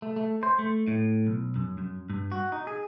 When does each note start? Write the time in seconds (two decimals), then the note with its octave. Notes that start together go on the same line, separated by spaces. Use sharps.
0.02 A3
0.16 A3
0.43 C5
0.59 A3
0.88 A2
1.27 B1
1.56 F#2
1.78 F#2
2.10 G2
2.32 F#4
2.52 D#4
2.67 G#4